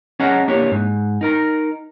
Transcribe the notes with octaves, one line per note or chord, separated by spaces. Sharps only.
C#4 G#4 D#5 F#5 A5 A#5
A#3 D4 E4 G4 C#5
G#2
D#4 A#4 A#5